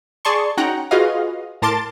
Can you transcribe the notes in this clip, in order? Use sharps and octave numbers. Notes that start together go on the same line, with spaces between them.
G#4 D5 A5 C6 C#6
C#4 D#4 F#4 F#5 G5 A#5
F4 F#4 G#4 B4 D#5 F5
A2 A#4 A5 C6 D6 A6